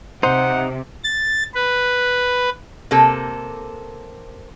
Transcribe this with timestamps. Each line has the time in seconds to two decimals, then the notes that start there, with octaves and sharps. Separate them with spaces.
0.23 C3 D#4 C5 F#5
1.04 A6
1.55 B4
2.91 C3 A#3 A4